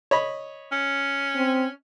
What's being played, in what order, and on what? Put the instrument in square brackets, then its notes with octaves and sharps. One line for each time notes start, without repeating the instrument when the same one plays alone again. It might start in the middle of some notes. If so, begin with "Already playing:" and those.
[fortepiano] C#5 D#5 B5
[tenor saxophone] C#4
[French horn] C4